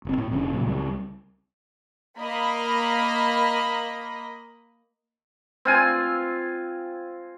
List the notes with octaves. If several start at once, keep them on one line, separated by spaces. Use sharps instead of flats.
F#1 C4
A2
F1 D3 C#4
A#2 C#3 F#3
C#2 G3
A#3 D#5 B5
C4 F4 G#5